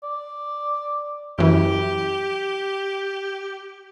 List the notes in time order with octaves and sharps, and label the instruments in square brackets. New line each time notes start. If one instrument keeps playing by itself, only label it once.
[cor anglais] D5
[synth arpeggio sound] F#2 E3 [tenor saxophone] G4